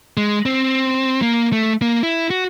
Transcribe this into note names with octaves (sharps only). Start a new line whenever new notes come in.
G#3
C4
A#3
A3
A#3
E4
F#4